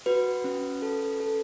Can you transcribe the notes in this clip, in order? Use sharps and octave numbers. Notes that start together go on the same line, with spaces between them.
F#4 B4
C#4
A4
A4